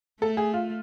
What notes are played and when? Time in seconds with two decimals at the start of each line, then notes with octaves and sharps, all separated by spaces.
0.22 A3 A4
0.37 G#4
0.53 F4